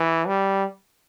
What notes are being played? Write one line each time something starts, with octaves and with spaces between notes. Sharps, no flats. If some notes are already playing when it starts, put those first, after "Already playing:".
Already playing: E3
G3